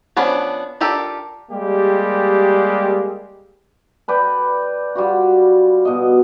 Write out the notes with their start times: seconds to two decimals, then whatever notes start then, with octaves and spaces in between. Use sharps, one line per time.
0.16 F3 B3 C#4 D4
0.81 D4 F4 G4 A4 A#4
1.51 G3 G#3 A#3 G4
4.08 A4 B4 D5 G5
4.95 G3 F4 F#4
5.85 B2 D#5